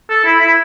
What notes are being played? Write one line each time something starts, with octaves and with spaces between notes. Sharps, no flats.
A4
E4
E4